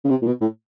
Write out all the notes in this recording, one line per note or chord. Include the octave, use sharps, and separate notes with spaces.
C#3
C3
A#2
B2
A2